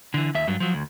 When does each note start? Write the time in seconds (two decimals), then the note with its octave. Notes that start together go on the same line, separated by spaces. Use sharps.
0.14 D3 E3
0.35 D#2 E5
0.47 G2 F#3
0.60 F3 F#3
0.74 D2